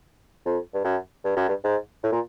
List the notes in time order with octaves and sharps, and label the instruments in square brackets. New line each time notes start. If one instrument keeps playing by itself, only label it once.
[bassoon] F2
G2
F#2
G2
F#2
G2
G#2
A2
A#2